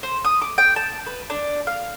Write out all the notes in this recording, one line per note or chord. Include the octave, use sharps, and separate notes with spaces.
C5
D#6
D6
G5
A5
B4
D4
F5